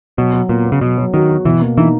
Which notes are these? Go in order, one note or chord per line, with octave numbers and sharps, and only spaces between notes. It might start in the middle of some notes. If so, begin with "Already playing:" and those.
B2 F#3
F#3
A#2 B3
B3
C#3
B2 F#3
F#3
D#3 F#4
F#4
B2 E3
A#3
E3 D#4